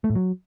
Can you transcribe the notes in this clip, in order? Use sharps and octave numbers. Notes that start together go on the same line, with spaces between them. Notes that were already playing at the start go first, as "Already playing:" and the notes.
A3
A2
F#3